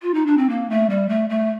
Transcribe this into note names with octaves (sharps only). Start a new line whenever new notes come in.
F4
D#4
D4
C4
A#3
A3
G3
A3
A3